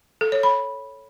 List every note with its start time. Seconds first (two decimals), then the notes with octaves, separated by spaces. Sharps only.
0.21 A4
0.32 C#5
0.43 B5